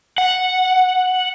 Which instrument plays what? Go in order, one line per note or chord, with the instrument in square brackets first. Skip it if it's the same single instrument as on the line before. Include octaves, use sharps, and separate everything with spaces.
[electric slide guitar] F#5